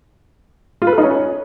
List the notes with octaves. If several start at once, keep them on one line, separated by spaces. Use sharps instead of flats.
F4
B4
A4
D#4
C#4